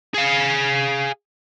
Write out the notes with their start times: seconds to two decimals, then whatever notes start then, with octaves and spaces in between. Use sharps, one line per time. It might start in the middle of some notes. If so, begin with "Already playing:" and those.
0.14 G#4 F5